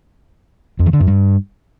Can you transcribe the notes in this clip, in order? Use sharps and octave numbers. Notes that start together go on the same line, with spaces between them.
F2
E3
D3
F#2
G2